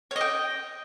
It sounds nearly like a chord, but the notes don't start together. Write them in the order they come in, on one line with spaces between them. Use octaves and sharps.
C#5 D#5 G5